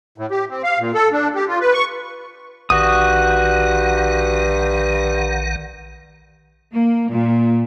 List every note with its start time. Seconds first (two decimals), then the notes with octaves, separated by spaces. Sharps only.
0.18 A2
0.31 G4
0.49 C4
0.64 F5
0.79 A#2
0.94 A4
1.12 D4
1.35 G4
1.48 F4
1.60 B4
1.74 C#6
2.70 A#1 G2 D#3 F#4 F#5 D#6
6.72 A#3
7.08 A#2